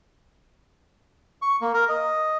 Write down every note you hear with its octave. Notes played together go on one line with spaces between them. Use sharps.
C#6
A#3
A#4
D#5